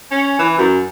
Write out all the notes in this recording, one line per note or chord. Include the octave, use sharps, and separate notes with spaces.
C#4
E3
F#2